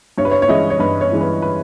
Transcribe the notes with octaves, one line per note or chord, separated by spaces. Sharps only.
G2 C#5
B4
C#5
C#5
E3 G#3 C#4 E4 D#5
C#5
G2 B4
C#5
E3 G#3 C#4 E4
B4
B4